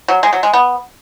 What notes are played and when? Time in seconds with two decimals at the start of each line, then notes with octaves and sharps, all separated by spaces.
0.08 F#3
0.23 G#3
0.33 F#3
0.43 G#3
0.53 B3